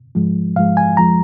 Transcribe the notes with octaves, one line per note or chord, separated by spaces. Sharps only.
G#2 F3 G#3
G#2 F3 G#3 F5
G#5
F2 F3 G#3 A#5